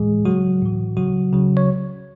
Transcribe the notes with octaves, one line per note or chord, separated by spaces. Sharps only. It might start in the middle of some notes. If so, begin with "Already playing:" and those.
Already playing: A2 E3 G#3 G#4
C#3 F#3 F#4
A2 E3
C#3 F#3 F#4
C#3 F#3
C#5